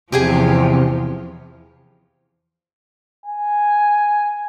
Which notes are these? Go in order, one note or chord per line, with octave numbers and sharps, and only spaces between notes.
E2 C3 F3 G4 G#4 G#5
G#5